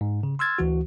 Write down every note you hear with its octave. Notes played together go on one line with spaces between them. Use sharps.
G#2
C#3
C6 E6 F6 G#6 A6
D2 E3 F#4